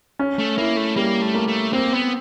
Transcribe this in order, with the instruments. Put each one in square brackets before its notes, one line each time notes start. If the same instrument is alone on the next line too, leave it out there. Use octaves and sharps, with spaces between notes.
[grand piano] C#4
[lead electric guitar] A3
[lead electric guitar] A#3 [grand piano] E4
[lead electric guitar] A3
[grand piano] G3 [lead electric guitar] A#3
[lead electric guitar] A3
[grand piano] A#3
[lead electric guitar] A3
[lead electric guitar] A#3 [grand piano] C4
[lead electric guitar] B3